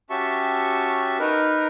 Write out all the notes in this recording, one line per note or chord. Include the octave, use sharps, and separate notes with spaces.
C#4 F#4 G4 E5 A5 C#6
D#4 A#4 B4